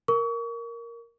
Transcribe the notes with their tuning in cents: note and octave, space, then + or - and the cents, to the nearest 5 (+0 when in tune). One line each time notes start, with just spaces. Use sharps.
A#4 +0 C#6 +35